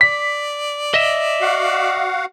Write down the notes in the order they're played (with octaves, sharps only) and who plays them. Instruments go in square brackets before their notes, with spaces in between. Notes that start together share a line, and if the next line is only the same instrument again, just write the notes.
[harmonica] D5 [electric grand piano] B6
[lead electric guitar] D#5 E5
[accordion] F#4 F5 F#5